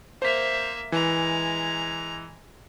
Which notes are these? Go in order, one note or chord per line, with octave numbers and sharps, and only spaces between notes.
A#3 C5 E5 B6
E3 G#3 A#5